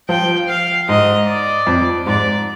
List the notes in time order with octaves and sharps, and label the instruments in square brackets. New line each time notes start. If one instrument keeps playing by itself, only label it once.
[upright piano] F3 [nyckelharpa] G5
[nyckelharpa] F5
[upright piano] G#2 [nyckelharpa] D#5
[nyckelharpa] D5
[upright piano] F2
[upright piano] G#2 [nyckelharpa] D5